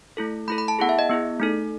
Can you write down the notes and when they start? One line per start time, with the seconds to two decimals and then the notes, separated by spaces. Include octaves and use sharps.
0.17 A3 E4 A4
0.48 A3 E4 A4 B5
0.58 B5
0.68 A5
0.79 B3 E4 G#4 F#5
0.89 E5
0.99 D#5
1.10 B3 E4 G#4
1.40 A3 D#4 A4